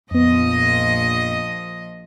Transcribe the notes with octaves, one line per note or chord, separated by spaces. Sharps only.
A#1 F2 F3 B3 D#5